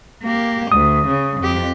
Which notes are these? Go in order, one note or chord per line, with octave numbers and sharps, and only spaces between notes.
A#3 G4
D2 D#6
C#3
F2 G4